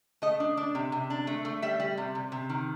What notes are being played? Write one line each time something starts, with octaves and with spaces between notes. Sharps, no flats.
A3 D#5
D4
D4
C3
C3
D4
A3
A3
G3 E5
G3
C3
C3
C3
D#3